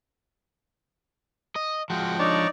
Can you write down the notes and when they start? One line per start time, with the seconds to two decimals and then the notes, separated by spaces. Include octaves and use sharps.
1.56 D#5
1.90 F3 G#3 F#4 G5
2.19 D4 D#4 C#5 D5